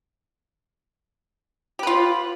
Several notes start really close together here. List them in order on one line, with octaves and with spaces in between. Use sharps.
G4 B4 F4